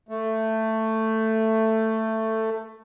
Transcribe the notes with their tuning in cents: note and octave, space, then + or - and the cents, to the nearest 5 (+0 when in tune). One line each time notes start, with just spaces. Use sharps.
A3 +10